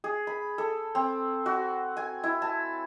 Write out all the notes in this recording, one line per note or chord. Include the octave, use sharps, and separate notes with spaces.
G#4
B5
A4
C4
F#4
G#5
E4
A5